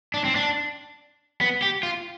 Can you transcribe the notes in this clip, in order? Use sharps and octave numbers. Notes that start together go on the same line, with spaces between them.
D4
C4
D4
B3
G4
F4